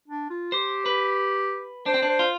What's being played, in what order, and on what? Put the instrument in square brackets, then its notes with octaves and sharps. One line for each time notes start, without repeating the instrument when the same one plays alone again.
[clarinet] D4
F4
[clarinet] G4 [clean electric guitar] C5
[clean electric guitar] B4
[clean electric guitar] D4 [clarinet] C5
[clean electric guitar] C4
D4
[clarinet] C5
[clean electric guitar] F4